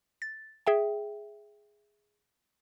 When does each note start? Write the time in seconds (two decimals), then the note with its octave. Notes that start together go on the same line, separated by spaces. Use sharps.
0.22 A6
0.67 G#4 E5 G5